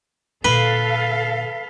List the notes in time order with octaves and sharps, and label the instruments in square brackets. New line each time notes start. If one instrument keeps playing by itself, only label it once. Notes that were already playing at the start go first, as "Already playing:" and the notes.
[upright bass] A#2 D3 [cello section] A4 F5 [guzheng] B4 [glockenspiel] B6 G7